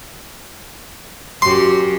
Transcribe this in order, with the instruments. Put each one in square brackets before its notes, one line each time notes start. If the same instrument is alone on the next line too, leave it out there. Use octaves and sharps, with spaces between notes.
[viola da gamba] F#2 F#4 G4 [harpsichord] C6